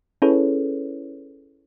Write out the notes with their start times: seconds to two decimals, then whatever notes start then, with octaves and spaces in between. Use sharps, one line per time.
0.22 C#4 E4 G#4 A4 B4 C#5